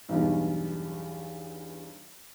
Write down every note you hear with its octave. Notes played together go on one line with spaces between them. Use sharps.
B1 E2 G2